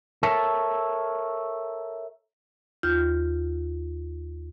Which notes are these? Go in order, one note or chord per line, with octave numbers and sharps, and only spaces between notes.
A4 A#4 C#5 E5 A5
D#2 F4 F6 G6